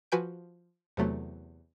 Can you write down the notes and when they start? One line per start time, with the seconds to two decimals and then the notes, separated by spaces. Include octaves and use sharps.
0.12 F3 F#4 B4 G#5 G6 D7
0.97 E2 C3 F#3 A3